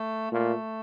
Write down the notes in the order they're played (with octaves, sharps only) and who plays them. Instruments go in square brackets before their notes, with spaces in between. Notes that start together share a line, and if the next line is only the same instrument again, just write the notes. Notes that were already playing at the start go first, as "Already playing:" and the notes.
Already playing: [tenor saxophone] A3
[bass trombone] A#2 [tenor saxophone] A3